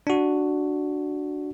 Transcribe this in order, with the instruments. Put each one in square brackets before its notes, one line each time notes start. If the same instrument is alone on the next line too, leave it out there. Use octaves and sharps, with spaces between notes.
[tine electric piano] D4 F#4